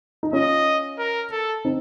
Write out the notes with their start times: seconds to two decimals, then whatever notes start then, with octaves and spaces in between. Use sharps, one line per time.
0.23 D#4
0.33 C#4 F4 D#5
0.98 A#4
1.32 A4
1.65 C4 D#4